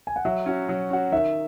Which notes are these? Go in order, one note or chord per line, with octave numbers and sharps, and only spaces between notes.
G#5
F#5
F#3 E5
C#4 F#4
F#3
C#4 F#4
D#3 E5